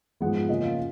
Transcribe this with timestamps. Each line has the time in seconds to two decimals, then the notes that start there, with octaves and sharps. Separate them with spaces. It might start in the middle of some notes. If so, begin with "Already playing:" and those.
0.21 G#2 F3 G#3 B3 F#5
0.49 C#3 F3 A#3 C#4 D#5
0.63 F4